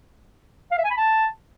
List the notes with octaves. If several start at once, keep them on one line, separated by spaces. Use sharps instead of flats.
F5
E5
G#5
B5
A5